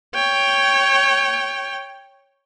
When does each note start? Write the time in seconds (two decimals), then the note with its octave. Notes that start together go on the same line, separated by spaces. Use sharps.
0.14 C#5 G5